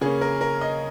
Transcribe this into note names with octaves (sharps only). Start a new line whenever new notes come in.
C#3 A#3 C#4 G#4
A#4
A#4
D#5